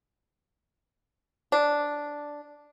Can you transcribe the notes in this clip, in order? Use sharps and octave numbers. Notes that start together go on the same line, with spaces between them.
D4